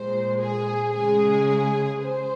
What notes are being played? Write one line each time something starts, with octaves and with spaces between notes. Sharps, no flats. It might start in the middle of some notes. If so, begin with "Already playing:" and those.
Already playing: A#2 G#3 C5
G#4
C#3 G#3 G#4
C#3 C5